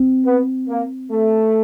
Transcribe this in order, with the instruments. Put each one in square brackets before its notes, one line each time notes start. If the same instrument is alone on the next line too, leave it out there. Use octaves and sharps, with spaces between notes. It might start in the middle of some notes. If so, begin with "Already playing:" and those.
Already playing: [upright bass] C4
[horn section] B3
A#3
A3